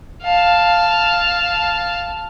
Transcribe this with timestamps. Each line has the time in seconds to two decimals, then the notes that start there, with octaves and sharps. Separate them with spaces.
0.23 F5 A5